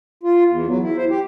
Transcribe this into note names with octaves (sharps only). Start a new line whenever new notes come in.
F4
E2
F#3
E4
C5
G4